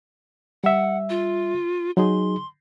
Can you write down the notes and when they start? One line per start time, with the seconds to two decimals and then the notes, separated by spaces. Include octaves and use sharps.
0.64 G3 E5 F#5
1.10 F4
1.97 F#3 D#4 G#4 C6